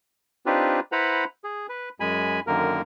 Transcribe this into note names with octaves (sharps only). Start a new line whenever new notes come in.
C4 D4 D#4 F4 G4 B4
E4 B4 C5 F#5 A#5 B5
G#4
B4
F#2 G#3 G#5 B5
F#2 D3 D#3 A#3 A#4